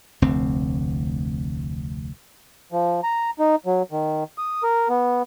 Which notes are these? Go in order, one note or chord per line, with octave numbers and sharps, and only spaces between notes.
F1 D2 C4
F3
A#5
D#4
F#3
D#3
D#6
A#4
B3